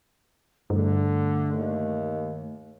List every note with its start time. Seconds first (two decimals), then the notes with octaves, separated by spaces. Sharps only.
0.70 G2 D3 A3
1.53 D#2